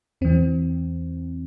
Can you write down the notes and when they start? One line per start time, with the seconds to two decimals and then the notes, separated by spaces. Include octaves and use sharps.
0.21 E2 E3 C4